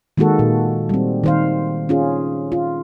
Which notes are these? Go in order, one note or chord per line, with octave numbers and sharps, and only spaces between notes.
D#3 G#3 A#3 F#4 A4
A#2
G3 C4
D#3 C5 F5
C#4 F4 G#4
F4